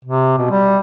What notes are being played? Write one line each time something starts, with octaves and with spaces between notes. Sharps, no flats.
C3
B2
G3